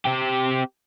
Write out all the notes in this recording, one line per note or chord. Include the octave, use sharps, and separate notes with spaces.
C4 G4